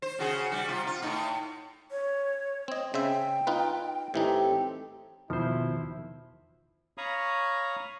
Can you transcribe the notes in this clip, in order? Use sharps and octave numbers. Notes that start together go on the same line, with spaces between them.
C5
C#3 F#4 G#4
G3 F#4
C3 F4
F4
A2 D#4
C#5
C4 D#5
C#3 C5 E5 G5
D#4 F4 B4
A2 E3 C4 D#4 G4 A4
E2 B2 D#3 F3 E4 C5
C#5 F5 A#5 B5 C#6 D#6